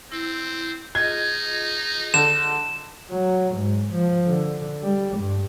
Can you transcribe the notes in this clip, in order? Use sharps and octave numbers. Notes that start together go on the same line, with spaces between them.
C4 E4
D#4 F4 G#4 D#5 G#6
D3 E7
F#3
G#2
F3
D3
G3
G2